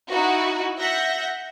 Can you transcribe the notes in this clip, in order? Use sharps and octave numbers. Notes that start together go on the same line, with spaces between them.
D#4 E4 F#4
E5 F#5 G6 A#6